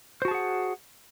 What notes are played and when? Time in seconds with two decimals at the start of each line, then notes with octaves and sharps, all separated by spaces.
0.22 C5
0.25 F#4
0.28 A5
0.31 G#4
0.34 F#5